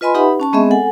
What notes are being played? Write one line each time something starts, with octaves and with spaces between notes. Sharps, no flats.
F4 B4 D#5 G#5 B5 C6
D#4 G4 B4 E5 F#5 B5
C#4 A5 C#6
G#3 B3 C4 G#4 D#5 E5
A4 F#5 G#5